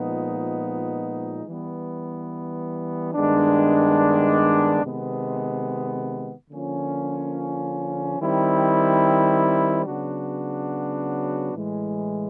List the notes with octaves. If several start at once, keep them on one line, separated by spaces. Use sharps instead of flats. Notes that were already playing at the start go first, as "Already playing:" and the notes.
Already playing: A#2 F3 G#3 B3 D#4
E3 G3 B3
G2 D#3 G#3 B3 D4
C3 D#3 G#3 B3
D3 F3 A#3 C#4 F4
D#3 G3 C4 E4
C#3 F#3 B3 D4 F#4
A2 E3 G#3